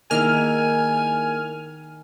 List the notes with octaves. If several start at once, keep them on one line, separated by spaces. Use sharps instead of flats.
D#3 A#3 E4 G#4 G#5 F6